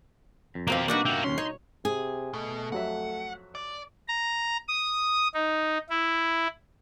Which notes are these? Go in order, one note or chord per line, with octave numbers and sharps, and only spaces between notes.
F2
B2 A#3 C4 G4 F5
G3 A#3 B3 D4 D#4 F#4
A#3 F#4 E5 G5
D#2 F3 C#4 C6
D#4 C#5
C3 G#4
B2 A3
F2 F#3 E5 F#5
D5
A#5
D#6
D#4
E4